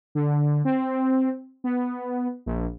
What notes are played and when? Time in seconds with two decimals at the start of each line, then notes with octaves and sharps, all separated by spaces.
0.15 D3
0.65 C4
1.64 B3
2.46 A#1